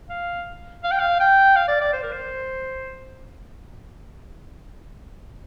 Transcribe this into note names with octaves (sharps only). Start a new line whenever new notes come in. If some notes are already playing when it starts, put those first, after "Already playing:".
F5
F5
G5
F5
G5
F5
D5
D5
C5
A#4
C5